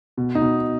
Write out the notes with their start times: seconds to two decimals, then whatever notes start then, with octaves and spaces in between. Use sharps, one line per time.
0.17 B2
0.35 D#4
0.41 B2